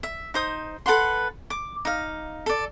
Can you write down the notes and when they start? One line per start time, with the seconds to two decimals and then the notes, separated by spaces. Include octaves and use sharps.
0.03 E5
0.34 D#4 C5 D#6
0.86 A4 B4 F#5 C6
1.50 D6
1.85 D#4 F5
2.46 A4 D5